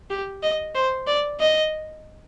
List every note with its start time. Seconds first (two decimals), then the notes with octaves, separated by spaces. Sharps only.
0.10 G4
0.43 D#5
0.75 C5
1.07 D5
1.40 D#5